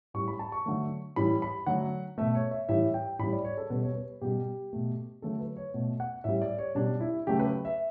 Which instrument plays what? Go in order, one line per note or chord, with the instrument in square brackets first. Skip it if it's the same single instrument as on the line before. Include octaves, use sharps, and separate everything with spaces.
[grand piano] A2 G3 C#6
B5
A5
C#6
D3 F#3 A3
A2 E3 G3 B5
B5
D3 F#3 A3 F#5
B2 A3 E5
C#5
E5
A2 E3 G3 E5
G5
A2 G3 B5
D5
C#5
A4
B2 G3 B4
C#5
B4
B2 G3 G4
B2 A3
D3 F#3 A3 A4
B4
C#5
B2 A3
F#5
A2 G3 E5
D5
C#5
B2 G3 D4
E4
C#3 F#3 A3 G4
B4
E5